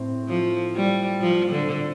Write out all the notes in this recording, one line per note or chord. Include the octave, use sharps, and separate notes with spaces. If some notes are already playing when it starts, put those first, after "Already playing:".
Already playing: A2 C4
F3
G3
F3
D3